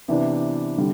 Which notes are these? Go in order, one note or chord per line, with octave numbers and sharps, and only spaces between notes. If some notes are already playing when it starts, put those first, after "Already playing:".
C3 E3 B3 D4
D3 G3